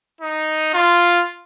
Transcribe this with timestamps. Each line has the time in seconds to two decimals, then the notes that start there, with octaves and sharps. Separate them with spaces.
0.21 D#4
0.74 F4